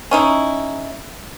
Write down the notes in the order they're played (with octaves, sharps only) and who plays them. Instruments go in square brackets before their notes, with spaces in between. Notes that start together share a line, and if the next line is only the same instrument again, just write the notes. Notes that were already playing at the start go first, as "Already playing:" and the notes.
[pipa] C#4 D#4 E4